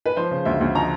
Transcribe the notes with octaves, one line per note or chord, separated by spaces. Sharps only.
B4
F3 C5
C#3
D2 E5
D2
F3 A#5